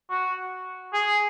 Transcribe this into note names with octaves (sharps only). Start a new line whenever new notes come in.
F#4
G#4